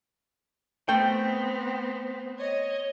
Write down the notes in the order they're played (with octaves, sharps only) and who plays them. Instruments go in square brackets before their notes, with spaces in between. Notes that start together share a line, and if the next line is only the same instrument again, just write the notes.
[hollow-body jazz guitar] A3 G5 [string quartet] B3 C4
[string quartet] C#5 D#5